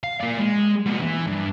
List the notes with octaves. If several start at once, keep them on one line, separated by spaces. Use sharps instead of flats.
F5
A#3 D5
G#3
A#2 B3
E3
G2